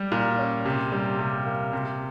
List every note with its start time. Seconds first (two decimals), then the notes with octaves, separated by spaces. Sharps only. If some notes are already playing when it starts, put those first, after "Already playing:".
Already playing: G3 G4
0.12 A#2
0.39 C#4
0.66 C3
0.92 G3
1.19 C3
1.46 A#3
1.73 C3